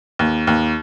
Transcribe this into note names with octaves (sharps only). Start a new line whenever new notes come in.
D#2
D#2